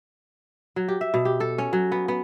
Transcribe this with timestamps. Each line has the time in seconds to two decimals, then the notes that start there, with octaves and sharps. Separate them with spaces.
0.76 F#3
0.88 G4
1.01 E5
1.14 B2
1.25 G4
1.40 A4
1.58 C#4
1.73 F#3
1.92 B3
2.08 B3